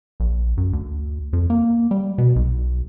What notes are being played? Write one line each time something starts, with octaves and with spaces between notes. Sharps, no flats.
A#1
F#2
D2
F2
A#3
G3
B2
B1